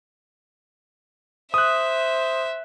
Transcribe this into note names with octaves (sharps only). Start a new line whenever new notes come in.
C5 E5 D#6 F#6